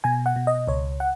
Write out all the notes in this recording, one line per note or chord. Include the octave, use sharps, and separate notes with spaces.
B2 G#5
F#5
B2
D#5
C#2 C#5
F#5